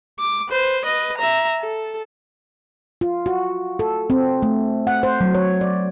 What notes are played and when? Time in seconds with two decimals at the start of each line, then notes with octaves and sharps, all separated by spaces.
0.19 D6
0.49 B4 C5
0.84 B4 D#5
1.18 E5 A#5
1.61 A4
3.01 F4
3.26 F#4
3.79 A4
4.10 C4
4.42 A3
4.87 F#5
5.03 C5
5.21 F#3
5.35 C#5
5.61 D5